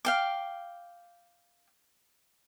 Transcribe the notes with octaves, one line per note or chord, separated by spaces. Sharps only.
F5 G5 D6